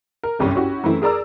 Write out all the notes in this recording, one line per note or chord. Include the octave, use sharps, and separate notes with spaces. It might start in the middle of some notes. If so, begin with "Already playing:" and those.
A#4
G1 C2 F#2 G3 C#4
C#4 E4 F#4 G4
F#2 E3 A3 C4 E4
G#4 A#4 D5 A#5 E6